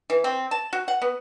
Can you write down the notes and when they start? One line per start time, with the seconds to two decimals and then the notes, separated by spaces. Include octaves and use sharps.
0.10 E3
0.24 C4
0.51 A5
0.73 F#4
0.88 F#5
1.02 B3